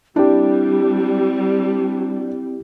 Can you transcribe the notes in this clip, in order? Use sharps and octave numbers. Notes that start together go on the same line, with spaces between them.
G3 C4 D4 E4 G4